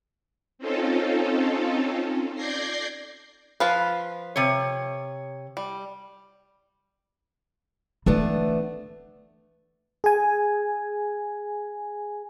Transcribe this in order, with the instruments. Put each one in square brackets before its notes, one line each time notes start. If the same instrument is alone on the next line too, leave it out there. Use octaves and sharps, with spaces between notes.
[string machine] C4 C#4 D#4 F4 A4
D5 G6 G#6 A#6 C7
[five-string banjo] F3 F4 B4
[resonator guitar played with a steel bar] C3 C#5
[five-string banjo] G3
[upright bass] E3 [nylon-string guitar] A3 B3 D4
[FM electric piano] G#4 G#5